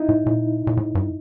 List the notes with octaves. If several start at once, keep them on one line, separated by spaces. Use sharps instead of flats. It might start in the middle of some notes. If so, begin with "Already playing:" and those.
Already playing: D#4 E4
A2
A#2
A#2
A2
G2